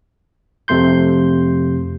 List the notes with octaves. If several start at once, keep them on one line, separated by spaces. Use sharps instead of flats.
F2 C3 A3 C6 G6